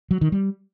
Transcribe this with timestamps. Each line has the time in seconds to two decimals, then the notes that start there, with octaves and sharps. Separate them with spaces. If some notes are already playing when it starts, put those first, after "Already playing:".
0.11 F#3
0.21 D#3
0.32 G3